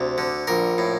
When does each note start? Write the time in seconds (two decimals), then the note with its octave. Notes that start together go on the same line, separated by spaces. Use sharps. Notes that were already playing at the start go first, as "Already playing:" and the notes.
Already playing: D2 C3
0.18 D3
0.47 A#1 A#4
0.78 A2